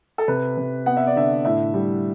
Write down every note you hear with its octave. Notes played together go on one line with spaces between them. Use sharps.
A4
C3 B4
C3
B3 F#5
E5
D5
D3 E5
A2 E5
G3